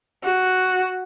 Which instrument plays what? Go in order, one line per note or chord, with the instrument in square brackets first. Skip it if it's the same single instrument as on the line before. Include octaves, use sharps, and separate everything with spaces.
[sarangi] F#4